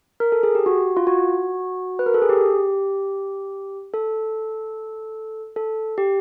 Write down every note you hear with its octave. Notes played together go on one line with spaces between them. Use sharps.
A#4
A4
G#4
G4
F#4
F4
F#4
B4
A#4
A4
G#4
G4
A4
A4
G4